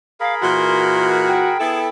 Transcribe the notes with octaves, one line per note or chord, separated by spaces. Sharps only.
G#4 A#4 F5 B5
A#2 E3 F#4 C6
G5
B3 E4 G#4 A4